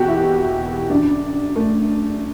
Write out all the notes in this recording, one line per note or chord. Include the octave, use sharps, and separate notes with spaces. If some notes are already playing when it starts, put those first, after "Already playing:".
Already playing: E2 B2 F#4 G4
E4
F#2 D3 D4
A3